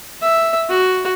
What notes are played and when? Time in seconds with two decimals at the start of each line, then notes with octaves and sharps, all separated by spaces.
0.22 E5
0.70 F#4